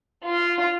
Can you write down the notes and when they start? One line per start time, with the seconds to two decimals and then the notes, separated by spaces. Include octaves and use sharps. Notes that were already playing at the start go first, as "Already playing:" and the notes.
0.25 F4